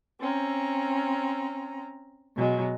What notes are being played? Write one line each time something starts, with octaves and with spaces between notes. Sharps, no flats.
C4 C#4 A#5
B2 F#3 G#3